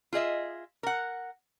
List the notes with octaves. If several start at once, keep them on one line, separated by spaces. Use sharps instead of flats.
F4 G#4 D#5 E5
A#4 F#5